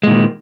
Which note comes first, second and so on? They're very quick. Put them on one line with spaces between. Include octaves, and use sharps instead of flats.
G#3 A#2 D#3